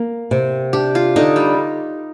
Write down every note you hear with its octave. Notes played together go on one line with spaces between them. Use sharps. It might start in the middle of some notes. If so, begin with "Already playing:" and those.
Already playing: A#3
C3
D4 G4
F4
D3 D#4
G3